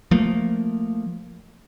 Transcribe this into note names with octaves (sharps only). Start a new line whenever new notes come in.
F3 A3 A#3